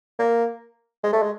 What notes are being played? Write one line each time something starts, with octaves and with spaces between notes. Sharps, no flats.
A#3
G#3
A3
G#3